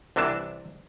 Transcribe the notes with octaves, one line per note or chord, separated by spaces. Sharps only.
C2 C3 E3 D4 A5